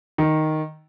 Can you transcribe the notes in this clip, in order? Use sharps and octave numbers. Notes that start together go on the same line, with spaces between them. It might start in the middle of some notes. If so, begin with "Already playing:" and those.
D#3